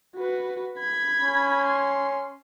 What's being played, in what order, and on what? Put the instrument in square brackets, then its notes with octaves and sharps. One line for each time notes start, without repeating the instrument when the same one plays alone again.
[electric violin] F#4 B4
B5 G#6
[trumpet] C#4
[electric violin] C6